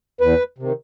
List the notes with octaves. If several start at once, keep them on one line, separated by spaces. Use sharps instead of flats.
E2 B4
C3 D#3